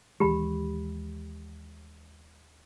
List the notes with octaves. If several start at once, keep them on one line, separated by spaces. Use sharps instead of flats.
D#2 E3 G#3 G4 B5